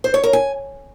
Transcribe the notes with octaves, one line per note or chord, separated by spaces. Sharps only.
C5
C#5
A#4
G#5